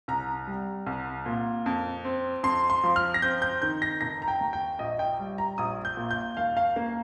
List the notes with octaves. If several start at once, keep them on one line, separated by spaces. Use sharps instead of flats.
C2 A#5
G3
C2
A#2
F2
C4
F2 C6
C6
F3
F6
A#6
C4 G6
G6
D#3 G6
A#6
F1 A#6
A#5
G5
D#2
G5
A#1 D#5
G5
G3
A#5
A#1 D#6
G6
A#2
G6
D#2 F5
F5
A#3